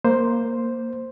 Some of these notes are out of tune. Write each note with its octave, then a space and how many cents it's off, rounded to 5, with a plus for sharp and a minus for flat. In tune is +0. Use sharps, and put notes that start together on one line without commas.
A#3 +0 C5 +0